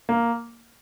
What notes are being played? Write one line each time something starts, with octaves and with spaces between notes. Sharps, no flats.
A#3